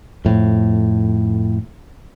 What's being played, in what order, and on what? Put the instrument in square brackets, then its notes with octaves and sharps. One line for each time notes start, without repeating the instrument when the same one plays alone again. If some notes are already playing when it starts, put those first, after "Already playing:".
[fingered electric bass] F2 A2